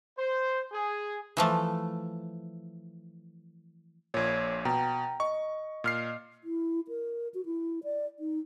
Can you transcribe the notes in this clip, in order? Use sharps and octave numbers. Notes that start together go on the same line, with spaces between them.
C5
G#4
E3 F3 A3
A#1 A#2 C#5 G#6
B2 G5 A#5
D#5 C#6
A#2 F6 C7
E4
A#4
F#4
E4
D5
D#4